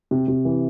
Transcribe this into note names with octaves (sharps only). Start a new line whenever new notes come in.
C3
C3
E3